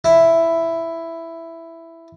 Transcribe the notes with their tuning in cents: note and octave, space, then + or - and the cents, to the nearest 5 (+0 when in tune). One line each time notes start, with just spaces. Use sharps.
E4 +5